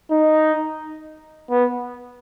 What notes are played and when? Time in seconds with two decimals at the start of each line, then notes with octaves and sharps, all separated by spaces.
0.11 D#4
1.51 B3